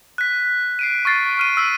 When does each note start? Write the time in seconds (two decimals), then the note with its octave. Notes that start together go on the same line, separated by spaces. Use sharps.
0.18 F#6 B6
0.79 C7 D7 D#7
1.05 C#6 F6 A6 C7
1.37 C#6 F6 D#7
1.57 E6 F6 B6 C7